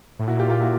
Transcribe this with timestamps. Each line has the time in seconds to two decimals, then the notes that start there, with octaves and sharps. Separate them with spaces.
0.19 A2
0.27 A#2 E4 F#4
0.40 F4 G4
0.50 F4 G4
0.61 E4 F#4